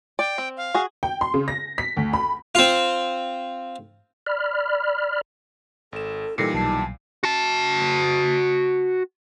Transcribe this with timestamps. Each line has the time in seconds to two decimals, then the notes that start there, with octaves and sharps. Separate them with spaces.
0.19 D5 G5
0.38 C4
0.57 F5
0.74 F#4 G#4
1.03 G5
1.21 C6
1.34 C#3
1.48 A#6
1.78 B6
1.97 D2
2.13 B5
2.55 C4 F4
4.27 D5 B5 F6
5.92 G#1 A4 E7
6.38 A#2 E3 G3 D#4 A4 A#6 C7 C#7
6.54 B1 A5 C7
7.24 F#4 A5